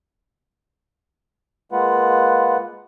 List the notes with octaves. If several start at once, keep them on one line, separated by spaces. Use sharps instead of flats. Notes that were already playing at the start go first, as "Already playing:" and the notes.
G#3 A#3 F4 B4 F#5